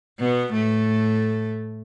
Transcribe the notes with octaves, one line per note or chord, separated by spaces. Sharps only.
B2 B3
A2 A3